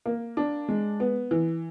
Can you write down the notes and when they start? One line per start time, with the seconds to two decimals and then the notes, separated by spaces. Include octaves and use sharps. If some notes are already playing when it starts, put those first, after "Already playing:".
0.06 A#3
0.37 D4
0.69 G#3
1.00 B3
1.31 E3